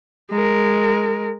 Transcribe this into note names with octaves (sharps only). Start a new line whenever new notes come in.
G#3 A#4